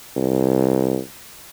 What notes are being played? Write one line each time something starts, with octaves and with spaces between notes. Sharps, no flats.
C2